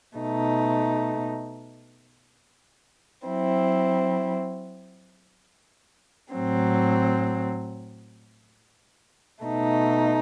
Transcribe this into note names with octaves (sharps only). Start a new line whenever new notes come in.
B2 A3 D#4
F#3 C4 E4
A2 F#3 C4
B2 A3 D#4